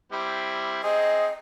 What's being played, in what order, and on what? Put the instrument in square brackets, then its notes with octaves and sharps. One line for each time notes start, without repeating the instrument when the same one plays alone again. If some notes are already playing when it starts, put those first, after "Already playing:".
[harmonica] G3 C4 E4
[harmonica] C4 G#4 [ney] D#5